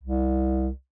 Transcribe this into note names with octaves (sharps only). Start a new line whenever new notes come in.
C2